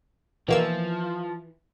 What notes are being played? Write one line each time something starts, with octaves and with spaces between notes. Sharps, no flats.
B2 E3 F3 A#3 E6